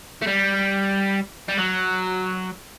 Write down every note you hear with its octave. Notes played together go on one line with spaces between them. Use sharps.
A3
G3
G3
F#3